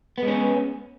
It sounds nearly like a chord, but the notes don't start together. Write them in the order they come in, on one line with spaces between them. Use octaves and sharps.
B3 G#3 C#4